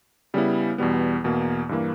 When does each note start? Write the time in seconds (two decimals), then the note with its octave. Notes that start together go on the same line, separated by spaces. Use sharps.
0.34 C#3 G3 B3 E4
0.78 E2 B2 G3 B3
1.24 E2 B2 A#3
1.69 G2 E3 A#3